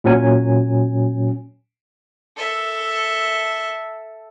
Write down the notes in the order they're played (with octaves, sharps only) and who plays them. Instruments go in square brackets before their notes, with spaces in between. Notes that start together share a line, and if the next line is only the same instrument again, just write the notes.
[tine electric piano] A#2 F#3 C#4 G#5
[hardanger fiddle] A4 E5